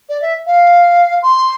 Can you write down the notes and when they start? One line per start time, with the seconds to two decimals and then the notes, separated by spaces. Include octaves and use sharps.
0.09 D5
0.22 E5
0.47 F5
1.23 C6